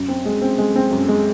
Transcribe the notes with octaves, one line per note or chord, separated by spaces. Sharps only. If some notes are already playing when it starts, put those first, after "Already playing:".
Already playing: F#2
C4
G#3
C4
G#3
C4
F#2
G#3